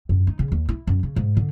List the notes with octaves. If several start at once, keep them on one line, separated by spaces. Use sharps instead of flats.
F#2
D#4
C#3
D#2
E4
F#2
C#3
G#2
D3